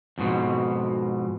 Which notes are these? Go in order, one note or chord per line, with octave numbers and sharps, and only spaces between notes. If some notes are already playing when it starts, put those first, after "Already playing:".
F2 G#2 B2